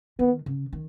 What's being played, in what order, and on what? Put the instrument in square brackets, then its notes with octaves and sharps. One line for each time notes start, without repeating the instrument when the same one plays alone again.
[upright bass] D#3 [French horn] B3
[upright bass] C#3
D#3